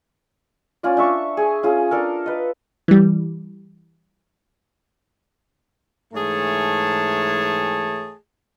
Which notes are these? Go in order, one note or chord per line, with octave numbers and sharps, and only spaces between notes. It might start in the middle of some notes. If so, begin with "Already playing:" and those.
C#4 F4 D5
D4 E5 C#6
G#4
C#4 F4 G#4
D4 A4 A#4
B4 D#5
E3 G3
G#2 E3 A3 G#4 C#5 A5